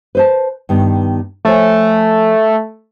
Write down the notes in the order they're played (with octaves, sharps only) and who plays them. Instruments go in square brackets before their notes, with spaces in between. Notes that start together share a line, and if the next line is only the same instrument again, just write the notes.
[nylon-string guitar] B4 C5 A5
G2 D#3 B3
[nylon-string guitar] F3 C#5 G#5 [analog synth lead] A3